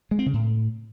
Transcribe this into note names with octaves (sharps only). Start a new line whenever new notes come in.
G#3
C4
C#3
A2